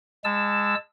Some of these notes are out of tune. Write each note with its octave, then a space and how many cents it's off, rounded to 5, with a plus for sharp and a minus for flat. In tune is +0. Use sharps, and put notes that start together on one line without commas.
G#3 -25 A5 +0 E6 +0